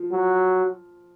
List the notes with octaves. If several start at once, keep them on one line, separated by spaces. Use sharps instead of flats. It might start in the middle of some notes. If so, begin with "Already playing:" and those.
Already playing: F3
F#3